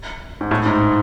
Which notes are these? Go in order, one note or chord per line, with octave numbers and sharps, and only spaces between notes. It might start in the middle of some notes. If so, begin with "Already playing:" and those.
G#2
A2
G#2